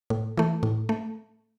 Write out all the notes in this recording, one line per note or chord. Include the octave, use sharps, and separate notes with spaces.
A2
E3 A3
A2
A3